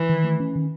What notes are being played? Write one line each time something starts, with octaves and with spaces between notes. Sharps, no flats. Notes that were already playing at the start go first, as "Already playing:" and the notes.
Already playing: E3
D#3
A3
C#4
D#3